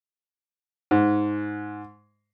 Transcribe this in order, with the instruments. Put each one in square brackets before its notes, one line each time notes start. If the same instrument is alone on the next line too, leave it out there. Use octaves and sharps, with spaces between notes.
[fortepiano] G#2